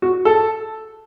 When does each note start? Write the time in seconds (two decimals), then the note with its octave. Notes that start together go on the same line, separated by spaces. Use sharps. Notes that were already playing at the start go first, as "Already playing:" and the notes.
0.02 F#4
0.25 A4